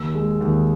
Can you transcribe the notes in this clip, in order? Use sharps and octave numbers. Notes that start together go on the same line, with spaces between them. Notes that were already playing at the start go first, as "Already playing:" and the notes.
Already playing: D#2 E6
G#3
D#2